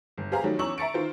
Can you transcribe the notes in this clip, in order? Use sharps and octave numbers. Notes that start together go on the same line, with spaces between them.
G1
G4 G#4 C5 F5 A#5
D#3 F#3 G3 A3
E2 C#4 A#5 C#6 E6 F#7
E5 A#5 C#6 A6 C#7 D7
D#3 F4 C5